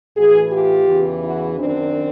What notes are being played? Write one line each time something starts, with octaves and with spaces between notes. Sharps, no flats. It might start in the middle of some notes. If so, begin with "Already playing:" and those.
A2 E3 F#4 G#4
F4 G4
E2 C#3 E3
E4 F#4
F#2 D#3 C4 D4